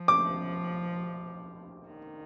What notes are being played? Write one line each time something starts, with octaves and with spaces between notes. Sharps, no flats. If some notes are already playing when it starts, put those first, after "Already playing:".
Already playing: F3
D6
D#3